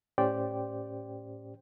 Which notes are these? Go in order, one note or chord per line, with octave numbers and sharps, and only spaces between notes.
A2 C#4 G4 C5 D5 G5